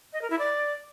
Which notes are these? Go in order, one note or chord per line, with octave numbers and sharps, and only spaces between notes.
D#5
A#4
E4
D5